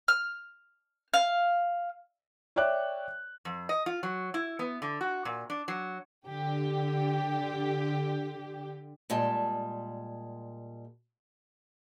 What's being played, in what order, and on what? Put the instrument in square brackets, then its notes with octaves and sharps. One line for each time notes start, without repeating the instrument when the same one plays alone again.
[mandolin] F6
F5
[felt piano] C#5 D5 E5 G5 D6 F#6
[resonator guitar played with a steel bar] F2
D#5
F4
F#3
E4
B3
D3
F#4
A#2
D4
F#3
[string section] D3 G4
[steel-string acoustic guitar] A#2 G3 G#3 A5